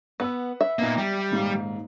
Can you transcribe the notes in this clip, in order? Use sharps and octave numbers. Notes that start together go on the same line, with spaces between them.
B3 B4 F#5 E6
E5
A#2 A#3 B3 D#4 A#5
G3 G4
D#1 G#2 F5